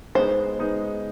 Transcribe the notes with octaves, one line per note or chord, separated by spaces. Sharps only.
G#3 B3 D#4 C5
G#3 B3 D#4